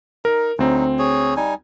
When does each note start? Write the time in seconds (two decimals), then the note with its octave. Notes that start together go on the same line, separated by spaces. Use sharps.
0.25 D#4 A#4
0.59 D2 F#3 C4 D#4
0.99 G#4 C#5
1.37 G3 D#4 G#5